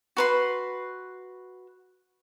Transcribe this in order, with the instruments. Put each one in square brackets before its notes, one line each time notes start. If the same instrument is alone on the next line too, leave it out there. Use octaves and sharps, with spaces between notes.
[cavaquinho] F#4 B4 C6